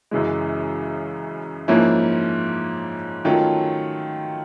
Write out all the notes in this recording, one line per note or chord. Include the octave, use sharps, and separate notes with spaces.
F#2 C#3 E3 G#3
G#2 F3 A#3 C#4 E4
D#3 F#3 A3 C#4 F4